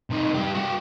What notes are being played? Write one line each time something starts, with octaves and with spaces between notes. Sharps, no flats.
C3 D#4
G2 G4
F#4 G5